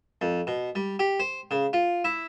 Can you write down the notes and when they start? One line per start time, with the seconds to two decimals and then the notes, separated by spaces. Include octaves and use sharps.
0.21 F2
0.47 B2
0.75 G3
0.99 G4
1.20 C5
1.51 C#3
1.73 F4
2.04 E4